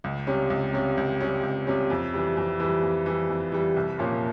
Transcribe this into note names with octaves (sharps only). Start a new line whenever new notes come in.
C#2
C3 G3 C#4
C#2
C3 G3 C#4
C#2
C3 G3 C#4
C#2
C3 G3 C#4
F2
E3 G3
F2
E3 G3
F2
E3 G3
F2
E3 G3
C2
A#2 F3 A#3 C#4